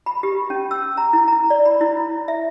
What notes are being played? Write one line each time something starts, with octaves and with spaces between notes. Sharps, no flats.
B5
G4
C#4
E6
A#5
E4
A#5
D5
B5
E4
E4
E5